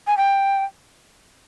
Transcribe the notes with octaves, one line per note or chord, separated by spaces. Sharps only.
G#5
G5